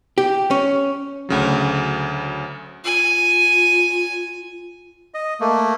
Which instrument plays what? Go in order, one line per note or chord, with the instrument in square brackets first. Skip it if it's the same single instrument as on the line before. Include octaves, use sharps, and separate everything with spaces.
[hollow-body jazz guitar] G4
C#4
[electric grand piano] D2 C#3 F#3
[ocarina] F4 [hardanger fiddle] G#5
[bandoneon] D#5
A3 A#3